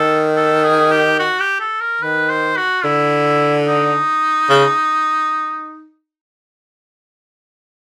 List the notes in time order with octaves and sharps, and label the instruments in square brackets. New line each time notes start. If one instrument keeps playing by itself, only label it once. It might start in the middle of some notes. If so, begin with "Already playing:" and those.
Already playing: [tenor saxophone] D#3 [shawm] A4
[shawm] A4
G#4
G4
F#4
G4
A4
A#4
[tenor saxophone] D#3 [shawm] B4
[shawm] C5
F#4
[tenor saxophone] D3 [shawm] E4
[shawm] D#4
[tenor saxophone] C#3